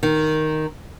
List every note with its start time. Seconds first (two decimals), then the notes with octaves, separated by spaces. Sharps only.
0.03 D#3